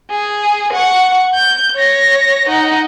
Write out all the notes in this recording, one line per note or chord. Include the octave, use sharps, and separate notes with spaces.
G#4
F#5 C#6
G6
C#5 A#6
D#4 F#5